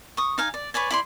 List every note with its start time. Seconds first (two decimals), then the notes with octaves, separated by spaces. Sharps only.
0.17 C#6 D#6
0.38 D#4 F5 G#5
0.54 D5
0.74 B4 C#5 D5 G#5
0.91 E4 D5 C6